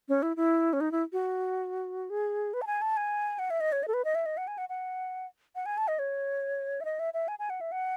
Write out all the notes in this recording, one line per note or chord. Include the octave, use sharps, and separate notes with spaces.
C#4
E4
E4
C#4
D#4
E4
F#4
G#4
B4
A5
G#5
A5
G#5
F#5
E5
D#5
C#5
D#5
A4
B4
D#5
E5
D#5
F#5
G#5
F#5
F#5
F#5
G#5
A5
D#5
C#5
E5
D#5
E5
E5
G#5
G#5
F#5
E5
F#5